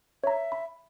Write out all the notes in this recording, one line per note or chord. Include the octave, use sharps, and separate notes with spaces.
C#5 E5 A#5
B5